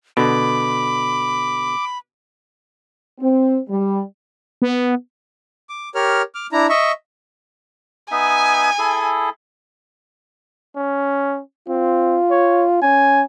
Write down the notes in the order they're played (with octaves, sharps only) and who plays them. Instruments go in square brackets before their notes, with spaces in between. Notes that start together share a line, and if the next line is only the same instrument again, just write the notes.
[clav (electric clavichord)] B2 D3 [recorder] B5 [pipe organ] D6
[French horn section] C4
G3
[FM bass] B3
[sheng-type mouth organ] D6
G4 A#4 C#5 F6
D6 F6
D4 E4 A#5
D#5 E5 C#6
[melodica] B3 D#4 E5 [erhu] G#5
[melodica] E4 G#4 A4
[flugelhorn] C#4
[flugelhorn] C4 [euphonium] F4
[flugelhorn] C#5
[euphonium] C#4 [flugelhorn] G#5